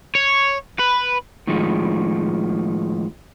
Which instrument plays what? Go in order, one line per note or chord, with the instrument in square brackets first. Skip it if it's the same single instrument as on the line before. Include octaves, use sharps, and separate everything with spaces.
[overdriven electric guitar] C#5
B4
[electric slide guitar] A2 D#3 F3 G#3